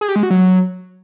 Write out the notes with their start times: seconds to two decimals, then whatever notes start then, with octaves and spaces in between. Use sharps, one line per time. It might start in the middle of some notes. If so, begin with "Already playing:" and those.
0.01 G#4
0.08 G4
0.16 G#3
0.23 F#4
0.30 F#3